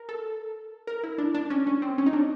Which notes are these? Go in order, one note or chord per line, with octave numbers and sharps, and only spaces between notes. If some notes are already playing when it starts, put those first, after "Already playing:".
Already playing: A#4
A4
A#4
E4
D4
D4
C#4
C#4
C4
C#4
D#4
D4